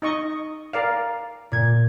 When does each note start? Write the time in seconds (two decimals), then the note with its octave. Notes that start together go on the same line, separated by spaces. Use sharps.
0.02 D#4 D#5 C#6
0.73 A#4 D5 F5
1.52 A#2 G#6